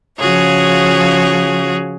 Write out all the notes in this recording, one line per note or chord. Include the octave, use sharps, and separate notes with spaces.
C#3 F3 F#4 G#4 C#5